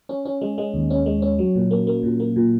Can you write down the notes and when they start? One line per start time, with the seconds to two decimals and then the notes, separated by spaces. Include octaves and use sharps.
0.09 C#4
0.25 C#4
0.41 G#3
0.58 G#3
0.74 D#2
0.90 C#4
1.06 G#3
1.22 C#4
1.39 F#3
1.55 A#2
1.71 A#3
1.87 A#3
2.03 A#2
2.20 A#3
2.36 A#2